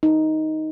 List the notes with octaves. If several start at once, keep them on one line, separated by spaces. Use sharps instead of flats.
D#4